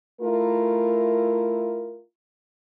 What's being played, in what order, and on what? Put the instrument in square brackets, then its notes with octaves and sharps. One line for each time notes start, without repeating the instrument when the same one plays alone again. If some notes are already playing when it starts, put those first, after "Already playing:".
[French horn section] A3 E4 F4 A#4